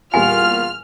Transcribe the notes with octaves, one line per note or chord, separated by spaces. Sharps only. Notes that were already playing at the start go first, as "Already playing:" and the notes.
E2 A#2 G3 F4 G#5 F6